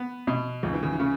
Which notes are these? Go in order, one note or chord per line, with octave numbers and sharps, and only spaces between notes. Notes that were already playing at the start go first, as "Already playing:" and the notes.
Already playing: B3
B2
C#2 C#3
E3
C#3
E3
C#3